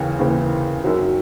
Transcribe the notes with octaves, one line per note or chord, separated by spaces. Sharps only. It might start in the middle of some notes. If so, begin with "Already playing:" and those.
Already playing: D#2 C#3 E3
D#2 C#3 E3
F#2 D#3 F#3